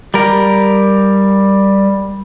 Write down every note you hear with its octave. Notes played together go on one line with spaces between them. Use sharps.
G3 A#4